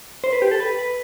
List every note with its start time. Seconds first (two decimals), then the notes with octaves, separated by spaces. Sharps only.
0.24 C5
0.33 B4
0.42 G4
0.51 A4
0.60 B4
0.79 B4